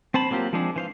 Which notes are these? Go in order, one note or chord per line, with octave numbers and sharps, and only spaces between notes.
C4 C5 A5 B5
F#3 A#3 C4 F4 G4
F3 G#3 C4 D4 G#4
E3 C5 F5